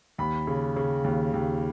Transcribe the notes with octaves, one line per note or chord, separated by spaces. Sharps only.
D#2 B5
C#3
C#3
D#2
D#2